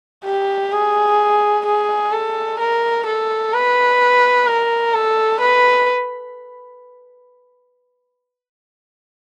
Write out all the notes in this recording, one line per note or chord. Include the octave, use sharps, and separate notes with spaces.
G4
G#4
G#4
A4
A#4
A4
B4
A#4
A4
B4